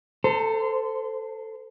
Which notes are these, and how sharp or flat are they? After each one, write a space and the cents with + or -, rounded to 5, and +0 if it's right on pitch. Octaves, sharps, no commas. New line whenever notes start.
A4 +10 C5 -25 A#5 -30